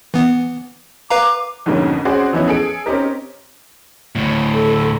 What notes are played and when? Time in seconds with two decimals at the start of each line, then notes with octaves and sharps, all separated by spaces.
0.14 E3 B3
1.10 B4 F5 A#5 D6
1.66 F2 G#2 B2 D3 A#3 C#4
2.05 C4 C#4 F#4 G#4 C5 D5
2.33 E3 F3 B3 C#4 D#4 E4
2.48 G#4 A4 D7
2.86 C4 C#4 D#4 G4 A#4
4.15 D2 A2
4.54 A4